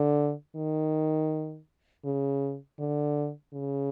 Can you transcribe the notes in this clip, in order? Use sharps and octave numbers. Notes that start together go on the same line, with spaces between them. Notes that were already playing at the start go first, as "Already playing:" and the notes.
Already playing: D3
D#3
C#3
D3
C#3